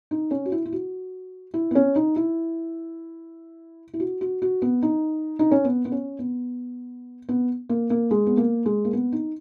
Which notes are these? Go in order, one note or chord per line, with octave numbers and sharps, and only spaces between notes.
D#4
C#4
F#4
E4
E4
F#4
E4
B3
C#4
D#4
E4
E4
F#4
F#4
F#4
B3
D#4
D#4
C#4
B3
B3
C#4
B3
B3
A#3
A#3
G#3
B3
A#3
G#3
A#3
B3
D#4